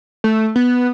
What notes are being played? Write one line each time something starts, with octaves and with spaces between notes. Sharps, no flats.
A3
B3